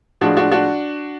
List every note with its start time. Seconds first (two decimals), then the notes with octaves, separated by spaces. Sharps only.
0.21 A2 F3 G#3 D4 F#4
0.37 D4 F#4
0.51 D4 F#4